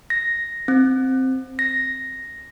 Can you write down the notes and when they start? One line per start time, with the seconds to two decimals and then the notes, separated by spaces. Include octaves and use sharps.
0.10 A#6
0.68 C4
1.59 A#6